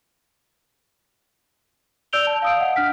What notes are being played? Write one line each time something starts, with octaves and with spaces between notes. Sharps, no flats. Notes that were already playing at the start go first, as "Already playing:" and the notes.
D5 E6 G6 D7 F7 G7
A5
F5 D#6 D7
D#5 F#5
D4 F6 B6